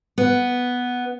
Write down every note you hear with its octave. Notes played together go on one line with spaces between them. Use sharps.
B3